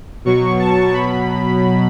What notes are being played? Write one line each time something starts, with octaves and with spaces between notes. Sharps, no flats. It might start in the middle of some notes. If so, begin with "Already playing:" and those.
B2 F#3 C#6
A5
B2 F#3 B5